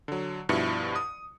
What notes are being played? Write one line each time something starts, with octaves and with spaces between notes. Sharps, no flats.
D3 F#3
G2 B2 F3 E4 C#7
D#6